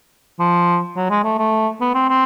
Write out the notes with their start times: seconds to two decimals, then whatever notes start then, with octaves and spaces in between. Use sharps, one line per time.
0.40 F3
0.96 F#3
1.10 G#3
1.24 A3
1.38 A3
1.81 B3
1.95 C4
2.10 C4